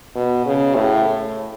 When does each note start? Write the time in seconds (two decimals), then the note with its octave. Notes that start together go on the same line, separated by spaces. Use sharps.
0.16 B2
0.46 C#3
0.76 A2